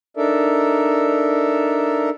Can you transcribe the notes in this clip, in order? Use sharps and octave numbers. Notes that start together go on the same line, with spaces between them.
D4 D#4 A4 A#4 D5 E5